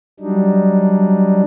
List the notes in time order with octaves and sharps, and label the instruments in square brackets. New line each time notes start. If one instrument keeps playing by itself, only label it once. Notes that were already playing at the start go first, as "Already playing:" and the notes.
[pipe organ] F#3 G3 D4 D#4